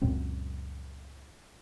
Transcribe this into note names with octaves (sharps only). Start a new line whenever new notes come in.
C#2 F#2 A#2 C4